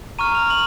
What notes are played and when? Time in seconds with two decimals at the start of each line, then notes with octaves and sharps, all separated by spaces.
0.19 A#5 C#6 F6 D#7
0.35 F7
0.50 F#7